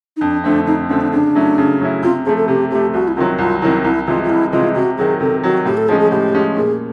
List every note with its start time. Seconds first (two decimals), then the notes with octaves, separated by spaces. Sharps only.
0.17 D#4
0.21 F2 D4
0.44 D3 F3 A3 C4 D4
0.67 F2 D#4
0.89 D3 F3 A3 C4 C#4
1.01 D4
1.12 C#3 D4
1.35 F#3 A3 C#4 E4
1.58 C#3
1.81 F#3 A3 C#4 E4
2.03 C3 F4
2.26 F3 A3 G#4
2.37 A4
2.48 C3 G4
2.71 F3 A3 G4
2.94 C2 F#4
3.08 E4
3.16 C3 D#3 F#3 F4
3.38 C2 F4
3.62 C3 D#3 F#3 E4
3.84 C2 E4
4.07 C3 E3 G#3 F4
4.24 F4
4.29 C2 E4
4.53 C3 E3 G#3 F4
4.75 C3 F#4
4.98 D#3 F#3 G#4
5.20 C3 A4
5.43 D#3 F#3 F#4
5.65 A2 G4
5.77 A4
5.88 F3 G#3 C#4 G#4
6.00 G#4
6.11 A2 G4
6.34 F3 G#3 C#4
6.57 A#2 G#4